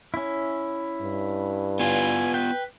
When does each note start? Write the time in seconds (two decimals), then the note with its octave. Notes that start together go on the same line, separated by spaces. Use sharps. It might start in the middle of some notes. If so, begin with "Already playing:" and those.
0.14 C#4 E4
1.01 G2
1.80 B3 F4 G#5
2.34 B4 G5